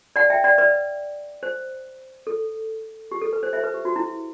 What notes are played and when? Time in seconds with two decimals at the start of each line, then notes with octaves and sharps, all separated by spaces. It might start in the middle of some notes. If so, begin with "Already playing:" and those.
0.16 D5 F#5
0.30 E5 G5
0.44 D5 F#5
0.58 B4 D5
1.43 C5
2.27 A4
3.11 G4
3.22 A4
3.33 B4
3.43 C5
3.53 C5 E5
3.64 B4
3.74 G4
3.85 F#4
3.96 E4